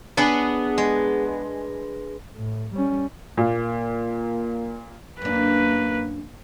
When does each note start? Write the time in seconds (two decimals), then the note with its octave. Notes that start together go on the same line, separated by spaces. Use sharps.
0.17 B3 D4 G#4 B4
0.78 G#3
2.35 A2
2.75 G3 C#4
3.37 A#2 A#3
5.22 F#2 A#3 D4 B4